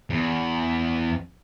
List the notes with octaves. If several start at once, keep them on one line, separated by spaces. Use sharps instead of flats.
E2